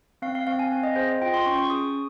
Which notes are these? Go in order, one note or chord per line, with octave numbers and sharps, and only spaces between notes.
C4 F5
F5
C4 F5
G#5
C4 F5
D#5
G#4 C5
D#5
F4 G5
C6
C#4 C#6
C#6
G#4 D#6